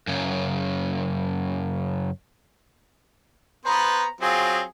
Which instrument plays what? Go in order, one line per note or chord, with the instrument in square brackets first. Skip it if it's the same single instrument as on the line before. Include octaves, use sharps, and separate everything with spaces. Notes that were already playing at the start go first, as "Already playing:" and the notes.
[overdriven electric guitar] F#2 C#3
[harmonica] B3 B4 C5 [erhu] A#5
[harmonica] F#3 C4 F4 [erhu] G#4